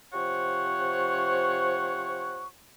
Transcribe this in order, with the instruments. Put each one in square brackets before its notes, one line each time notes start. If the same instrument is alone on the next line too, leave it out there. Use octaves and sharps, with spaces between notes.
[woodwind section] C3 F3 C5 C#5 F#5 C#6